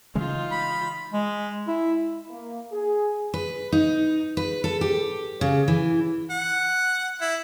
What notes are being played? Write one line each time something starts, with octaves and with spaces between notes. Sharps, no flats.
C#3 E3 G#3 D#4 F4
B5
G#3
E4
A#3
G#4
B4
D#4
B4
A4
G4
C#3
E3
F#5
E4